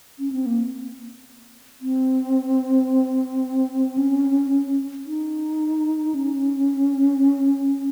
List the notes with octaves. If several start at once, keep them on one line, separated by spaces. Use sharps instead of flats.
C#4
C4
A#3
C4
C#4
D#4
C#4